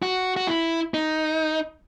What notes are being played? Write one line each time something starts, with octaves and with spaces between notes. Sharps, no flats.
F#4
F#4
E4
D#4